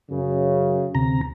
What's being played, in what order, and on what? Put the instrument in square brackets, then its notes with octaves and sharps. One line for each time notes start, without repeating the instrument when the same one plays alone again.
[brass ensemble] F#2 C#3
[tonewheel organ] D2 C3 A#5